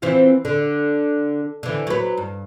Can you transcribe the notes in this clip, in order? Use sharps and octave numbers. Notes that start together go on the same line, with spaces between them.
E3 C4 F4
D3
D3 E3
F#3 B4
G2